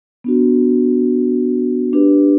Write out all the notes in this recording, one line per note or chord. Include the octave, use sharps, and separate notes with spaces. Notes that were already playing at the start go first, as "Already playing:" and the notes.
B3 D4 F#4
D4 G4 B4